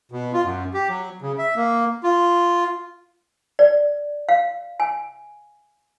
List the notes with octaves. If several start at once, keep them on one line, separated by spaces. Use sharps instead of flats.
B2
F4
F#2
G4
F#3
C#3
E5
A#3
F4
D5
F5
G#5